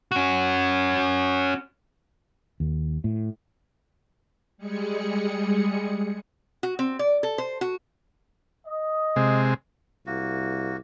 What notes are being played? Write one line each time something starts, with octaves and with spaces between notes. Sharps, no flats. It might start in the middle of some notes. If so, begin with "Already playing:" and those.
C#4 F#4
D#2
A2
G3 G#3 G#4 C#7
F#4
C4
D5
A4
C5
F#4
D#5
C3 G#3
C2 A#3 F#4